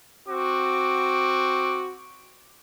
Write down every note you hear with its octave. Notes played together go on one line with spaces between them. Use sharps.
C4 F#4 D6